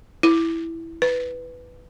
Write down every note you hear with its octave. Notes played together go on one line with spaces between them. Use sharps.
E4
B4